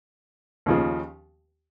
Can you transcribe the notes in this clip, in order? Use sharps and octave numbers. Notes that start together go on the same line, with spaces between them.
D#2 C#3 F3